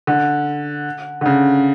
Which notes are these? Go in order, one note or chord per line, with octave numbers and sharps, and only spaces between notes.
D3
D3
C#3